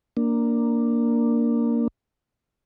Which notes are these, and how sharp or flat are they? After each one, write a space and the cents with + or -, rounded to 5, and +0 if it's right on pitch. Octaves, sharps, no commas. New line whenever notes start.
A#3 +0 D4 +0